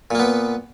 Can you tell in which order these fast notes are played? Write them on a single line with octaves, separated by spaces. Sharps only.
A#2 A#3 B3